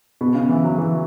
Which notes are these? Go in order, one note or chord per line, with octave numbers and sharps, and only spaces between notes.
B2
C#3
E3
F#3
E3